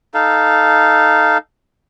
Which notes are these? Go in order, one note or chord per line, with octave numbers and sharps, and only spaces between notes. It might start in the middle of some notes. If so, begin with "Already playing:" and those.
D#4 A4 F5